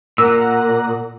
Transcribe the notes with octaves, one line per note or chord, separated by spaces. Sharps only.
A#2 A#4 F#5 A#5 E6